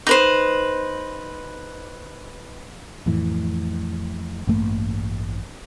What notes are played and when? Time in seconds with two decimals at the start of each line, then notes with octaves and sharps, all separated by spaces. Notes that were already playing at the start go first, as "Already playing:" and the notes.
0.07 D#4 B4 C5
3.06 F2 A2 E3
4.47 A1 G2 A3 A#3